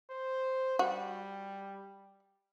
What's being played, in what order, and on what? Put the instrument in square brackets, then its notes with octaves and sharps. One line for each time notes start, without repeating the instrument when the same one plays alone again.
[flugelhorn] C5
[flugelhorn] G3 [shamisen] F#4